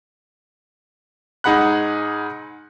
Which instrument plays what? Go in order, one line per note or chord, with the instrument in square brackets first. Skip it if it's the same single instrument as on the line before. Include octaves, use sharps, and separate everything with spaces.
[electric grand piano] G#2 D#4 G#4 F#5 B5 F#6